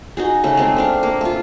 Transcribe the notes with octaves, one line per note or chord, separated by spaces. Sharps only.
D#4 F#4 G#4
C#3 A3 D#4
G#3 A#3 C4
A3 D4 F5
A#3
A3 F4